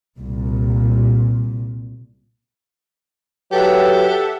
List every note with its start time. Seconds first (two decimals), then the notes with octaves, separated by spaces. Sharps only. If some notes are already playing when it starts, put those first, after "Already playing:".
0.18 C2 A#2
3.52 F#3 G4 A4 B4 E5 F#5